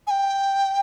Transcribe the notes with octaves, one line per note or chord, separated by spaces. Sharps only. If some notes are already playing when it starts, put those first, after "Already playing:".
G#5
G5